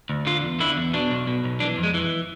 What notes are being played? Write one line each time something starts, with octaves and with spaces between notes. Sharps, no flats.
D2
D3 F4
E2
D3 E4
E2
B2 D4
B1
B2
B1
E3 D4
F2
G#3
E3